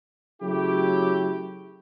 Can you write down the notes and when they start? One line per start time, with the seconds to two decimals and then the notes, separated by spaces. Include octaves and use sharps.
0.42 C#3 F#3 A3 E4 G4